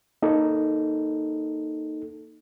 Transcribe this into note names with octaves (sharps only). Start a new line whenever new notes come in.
A#3 D#4 A4